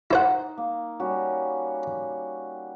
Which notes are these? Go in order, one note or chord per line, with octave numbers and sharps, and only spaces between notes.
D#4 E4 C5 F#5
A#3
G3 C#4 F#4